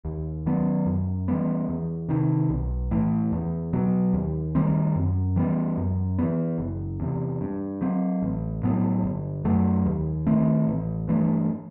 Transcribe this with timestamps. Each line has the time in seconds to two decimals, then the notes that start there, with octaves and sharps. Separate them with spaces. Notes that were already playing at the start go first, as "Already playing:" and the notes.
0.05 D#2
0.46 D#3 F#3 B3
0.86 F#2
1.28 E3 G3 B3
1.69 E2
2.09 C3 D#3
2.50 B1
2.91 A2 E3
3.32 E2
3.73 B2 F#3
4.14 D#2
4.55 D#3 G3 C4
4.96 F#2
5.36 E3 G3 B3
5.78 F#2
6.18 E3 B3
6.58 F#1
7.00 E2 C3
7.41 G2
7.81 F#3 C4
8.23 A1
8.63 A2 F#3 B3
9.03 G1
9.45 F#2 F#3 A3
9.86 D#2
10.27 D#3 A3 C4
10.68 A1
11.09 G2 E3 A3